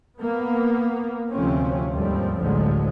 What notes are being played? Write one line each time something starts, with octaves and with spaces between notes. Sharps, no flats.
A#3 B3
D2 C3 F3 A3 C4 C#4
D#2 G#2 F3 G3 A3 C4
A1 D2 D3 F3 F#3 G#3